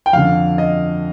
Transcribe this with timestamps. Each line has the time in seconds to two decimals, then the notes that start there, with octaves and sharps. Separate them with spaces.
0.06 G5
0.13 F2 D3 F5
0.58 D#5